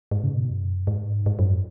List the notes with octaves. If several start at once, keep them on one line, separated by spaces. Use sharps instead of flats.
G#2
C#3
B2
F#2
G#2
G#2
F#2